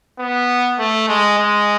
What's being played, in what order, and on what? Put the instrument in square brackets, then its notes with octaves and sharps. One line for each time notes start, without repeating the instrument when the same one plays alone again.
[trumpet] B3
A3
G#3
G#3